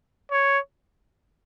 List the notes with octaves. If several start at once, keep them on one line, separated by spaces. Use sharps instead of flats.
C#5